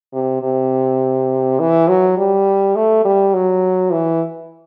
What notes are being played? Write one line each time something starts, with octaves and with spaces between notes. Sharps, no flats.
C3
C3
E3
F#3
G3
A3
G3
F#3
E3